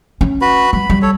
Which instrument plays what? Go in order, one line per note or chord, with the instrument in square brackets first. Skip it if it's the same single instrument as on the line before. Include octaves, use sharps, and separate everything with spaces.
[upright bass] C#4
[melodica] F#4 B4 B5
[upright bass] G3 [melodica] B5
[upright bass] G3
[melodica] A4 C#5